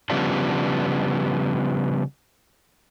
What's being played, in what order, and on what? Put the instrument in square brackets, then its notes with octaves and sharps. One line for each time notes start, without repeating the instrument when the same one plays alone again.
[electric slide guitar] C#3 F3 G3 B3 D4